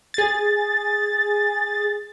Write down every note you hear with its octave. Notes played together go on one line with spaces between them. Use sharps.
G#4 A6